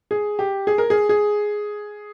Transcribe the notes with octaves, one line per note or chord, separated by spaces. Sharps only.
G#4
G4
G#4
A#4
G#4
G#4